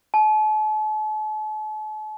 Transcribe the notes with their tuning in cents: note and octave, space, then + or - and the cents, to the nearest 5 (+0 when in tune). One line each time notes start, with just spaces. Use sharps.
A5 -40